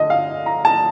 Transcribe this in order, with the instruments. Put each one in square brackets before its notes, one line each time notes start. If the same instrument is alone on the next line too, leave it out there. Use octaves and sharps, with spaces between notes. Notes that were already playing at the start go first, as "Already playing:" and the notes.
Already playing: [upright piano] D3 D#5
F5
A#5
A5